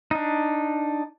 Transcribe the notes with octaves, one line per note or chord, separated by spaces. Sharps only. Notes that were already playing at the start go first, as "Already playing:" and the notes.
D4 D#4